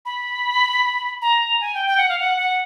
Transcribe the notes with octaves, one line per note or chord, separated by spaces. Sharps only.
B5
A#5
G#5
G5
G5
F#5
F5
F#5
F#5